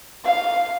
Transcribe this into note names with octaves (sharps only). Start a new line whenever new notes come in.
F5